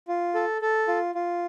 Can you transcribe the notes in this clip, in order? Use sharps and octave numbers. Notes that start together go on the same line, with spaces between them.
F4
A4
A4
F4
F4